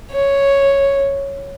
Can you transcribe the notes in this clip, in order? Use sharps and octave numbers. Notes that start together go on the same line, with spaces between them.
C#5